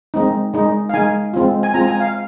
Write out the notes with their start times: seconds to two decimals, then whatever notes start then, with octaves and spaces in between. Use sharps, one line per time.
0.14 G#3 C4 D#4
0.54 G#3 D#4
0.89 F5
0.94 G#3 D#4 G#5
1.34 G#3 C4 F4
1.63 G#5
1.74 G#3 C4 F4 A#5
1.87 G#5
2.00 F5